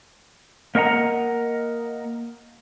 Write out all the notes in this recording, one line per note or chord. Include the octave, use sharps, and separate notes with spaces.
A#3 A#4 D#5 F#5 A#5